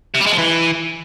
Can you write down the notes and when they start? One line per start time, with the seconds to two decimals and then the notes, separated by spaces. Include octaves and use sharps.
0.15 C3
0.21 G3
0.27 G#3
0.32 F3
0.38 E3